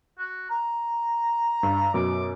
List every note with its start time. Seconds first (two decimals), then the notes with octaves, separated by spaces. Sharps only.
0.18 F#4
0.50 A#5
1.63 G2
1.94 F#2 B2 D6